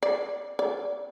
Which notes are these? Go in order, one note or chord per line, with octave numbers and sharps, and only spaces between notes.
D5
D5